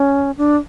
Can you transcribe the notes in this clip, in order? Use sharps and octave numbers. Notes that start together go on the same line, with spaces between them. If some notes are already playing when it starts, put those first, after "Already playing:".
Already playing: C#4
D4